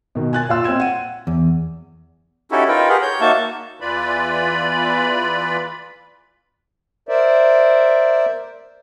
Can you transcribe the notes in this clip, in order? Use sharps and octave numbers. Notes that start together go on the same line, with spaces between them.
B2 D#3
G#5 F#6 A6
A#2 F4 F5 E6
C4 D#5 G5 G#6 E7
F#5 D#7
E2
C#4 D#4 E4 F#4 G4 A4
D#4 F4 A#4 B4 G5
G4 G#4 A#4 F#5
C#5 G6
A#3 D#4 F#4 E5 A5
E2 E3 F4 B4 D5 B5
A#4 C5 D5 E5